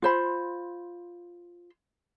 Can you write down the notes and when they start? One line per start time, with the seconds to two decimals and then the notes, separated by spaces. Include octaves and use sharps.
0.02 F4 C5 B5